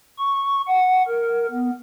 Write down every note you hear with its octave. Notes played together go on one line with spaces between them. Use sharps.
C#6
F#5
A#4
B3